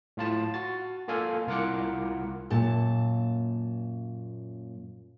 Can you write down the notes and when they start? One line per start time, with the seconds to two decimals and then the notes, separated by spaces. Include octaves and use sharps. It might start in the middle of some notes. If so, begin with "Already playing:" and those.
0.17 A2 F4 A5
0.54 F#4 A6
1.08 A#3 F4 A4 F5 G#5
1.47 C2 F4 A#4 F#5 D6 C#7
2.50 F#2 A#2 A5